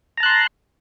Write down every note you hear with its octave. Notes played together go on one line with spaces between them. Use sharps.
A5 A#5 C6 F#6